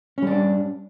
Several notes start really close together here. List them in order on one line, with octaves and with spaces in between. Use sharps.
C#4 G3 D4